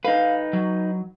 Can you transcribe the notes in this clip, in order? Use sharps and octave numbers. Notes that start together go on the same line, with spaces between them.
D#4 B4 F5
F#3